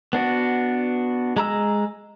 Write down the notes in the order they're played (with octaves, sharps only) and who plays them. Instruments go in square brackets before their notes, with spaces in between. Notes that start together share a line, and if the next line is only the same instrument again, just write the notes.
[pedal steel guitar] B3 D4 F#4
G#3 A#5 E6